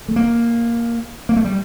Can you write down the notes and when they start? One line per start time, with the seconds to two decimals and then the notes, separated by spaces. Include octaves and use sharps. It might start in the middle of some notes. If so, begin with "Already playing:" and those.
0.08 A3
0.16 A#3
1.29 A#3
1.36 A3
1.45 G3